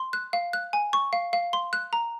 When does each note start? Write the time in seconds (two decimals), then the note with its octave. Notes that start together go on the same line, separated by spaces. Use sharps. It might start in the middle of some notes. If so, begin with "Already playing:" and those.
Already playing: C6
0.13 F#6
0.33 F5
0.53 F#6
0.73 G#5
0.93 C#6
1.13 F5
1.33 F5
1.53 C6
1.73 F#6
1.93 A#5